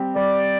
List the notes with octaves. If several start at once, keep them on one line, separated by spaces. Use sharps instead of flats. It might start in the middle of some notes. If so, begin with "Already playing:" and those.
Already playing: G3 C4 G4
G3 D5